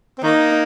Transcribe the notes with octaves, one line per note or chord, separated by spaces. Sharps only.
C4
D#3 A#3 D#4